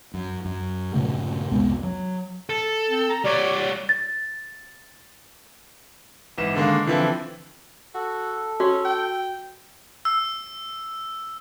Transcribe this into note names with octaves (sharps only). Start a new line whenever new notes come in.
F#2
F#2
G2 A#2 C#3 A3
C2 F2 G#3 B3
F#3
A4
C4
A#5
G3 C#5 D5
A6
G#1 E3 E7
D3 D#3 G#3 A#3
D3 E3 F3 C4 E4
F#4 A4
C#4 F#4
G5
E6